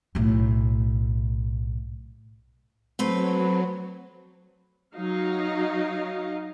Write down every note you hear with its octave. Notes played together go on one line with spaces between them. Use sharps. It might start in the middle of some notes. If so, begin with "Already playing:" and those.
B1 A2
F#3 A3 C4 B4
F#3 D#4 F5